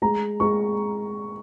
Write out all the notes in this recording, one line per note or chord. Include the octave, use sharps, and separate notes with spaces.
G#3 A#5
G#3 C#6